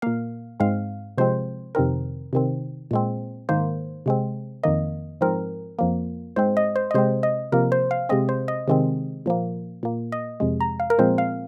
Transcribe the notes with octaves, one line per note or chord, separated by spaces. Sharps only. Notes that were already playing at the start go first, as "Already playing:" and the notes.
A#2 A#3 F5
G#2 G#3 C4 F5
C3 F3 G#3 C4 C5
F2 C3 D#3 C4 A#4
C3 D#3 C4
A#2 G#3 C4
G#2 D#3 A#3 C5
C3 G#3 C4
F2 D#3 A#3 D#5
G#2 F3 C4 A#4
F2 F3 A#3
G#2 G#3 C4 C5
D#5
C5
D#5
C3 G#3 C4 C5
D#5
C3 F3 A#3 A#4
C5
F5
C3 G#3 C4 D#5
C5
D#5
C3 D#3 G#3 C4
A#2 F3 A#3
A#2 A#3
D#5
F2 C3 G#3
A#5
F5
A#4
A#2 F3 G#3 C4 C5
F5